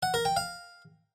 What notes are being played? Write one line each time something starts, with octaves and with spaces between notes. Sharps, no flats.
F#5
A#4
G5
F5